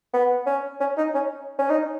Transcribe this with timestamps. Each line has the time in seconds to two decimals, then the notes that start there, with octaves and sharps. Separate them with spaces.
0.13 B3
0.46 C#4
0.80 C#4
0.97 D#4
1.14 C#4
1.59 C#4
1.70 D#4